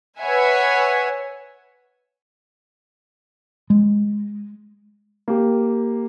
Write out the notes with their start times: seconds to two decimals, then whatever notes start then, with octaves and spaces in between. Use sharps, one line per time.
0.19 B4 C#5 E5 F#5 G#5
3.70 G#3
5.28 A#3 G4